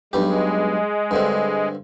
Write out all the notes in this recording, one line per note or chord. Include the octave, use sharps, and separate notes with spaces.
B1 G2 G#3 G4
G2 D3 C4